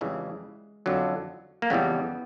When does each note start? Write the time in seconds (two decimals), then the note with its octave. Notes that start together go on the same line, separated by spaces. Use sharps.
0.01 F2 C#3 E3 G3 G#3
0.86 F2 D3 F#3
1.62 A#3
1.70 F2 C#3 E3 G3 B3